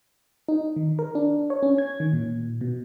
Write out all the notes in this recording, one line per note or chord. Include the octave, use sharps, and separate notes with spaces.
D#4
D#3
A#4
D4
C#5
C#4
G#6
D#3
A#2
B2